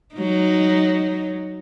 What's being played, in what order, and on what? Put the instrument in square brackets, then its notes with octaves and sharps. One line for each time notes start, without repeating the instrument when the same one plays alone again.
[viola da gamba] F#3 D#4